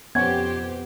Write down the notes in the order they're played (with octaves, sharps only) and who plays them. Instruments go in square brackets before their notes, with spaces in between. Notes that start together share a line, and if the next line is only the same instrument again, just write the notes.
[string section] F2 G4 C5 [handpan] B3 [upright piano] C#4 F#5 C#6 [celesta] G#6